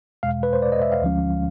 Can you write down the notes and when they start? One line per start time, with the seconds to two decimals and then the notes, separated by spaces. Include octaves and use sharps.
0.23 E2 B2 G#3 F5
0.43 B4
0.53 C5
0.62 D5
0.72 D#5
0.82 E5
0.92 F5
1.02 D2 D3 F3 G#3 C#4